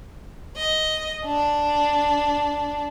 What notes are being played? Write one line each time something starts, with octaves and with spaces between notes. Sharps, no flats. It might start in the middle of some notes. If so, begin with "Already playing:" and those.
D#5
D4